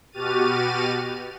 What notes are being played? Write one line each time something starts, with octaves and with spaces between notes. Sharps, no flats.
B2 F#4 G4 F6 A6 D#7